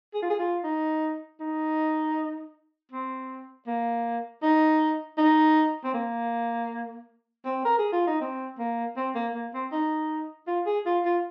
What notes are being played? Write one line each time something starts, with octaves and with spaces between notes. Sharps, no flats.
G#4
F4
G#4
F4
D#4
D#4
C4
A#3
D#4
D#4
C4
A#3
C4
A#4
G#4
F4
D#4
C4
A#3
C4
A#3
A#3
C4
D#4
F4
G#4
F4
F4